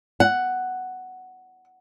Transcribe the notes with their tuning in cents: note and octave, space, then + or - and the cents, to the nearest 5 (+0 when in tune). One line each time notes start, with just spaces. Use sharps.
F#5 +5